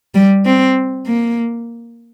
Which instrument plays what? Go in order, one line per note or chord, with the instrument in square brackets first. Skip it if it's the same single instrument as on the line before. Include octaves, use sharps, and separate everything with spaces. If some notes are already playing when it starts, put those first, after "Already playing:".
[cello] G3
C4
A#3